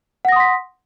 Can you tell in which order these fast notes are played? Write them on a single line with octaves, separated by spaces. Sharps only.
F#5 A#6 D#6 C6 B6